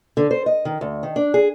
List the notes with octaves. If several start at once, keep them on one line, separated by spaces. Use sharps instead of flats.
D3
C5
D#5
D#3
D2
D#3
D4
G#4